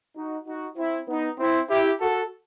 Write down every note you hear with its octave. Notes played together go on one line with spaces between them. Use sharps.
D#4 F#4
D#4 F#4
C4 E4
B3 D#4
C4 E4
E4 G4
F#4 A4